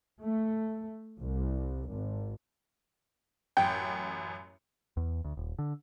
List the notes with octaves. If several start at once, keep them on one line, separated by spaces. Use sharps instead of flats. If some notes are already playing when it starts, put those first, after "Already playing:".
A3
C2
G#1
A1 F#2 G5
E2
D2
D#1
D3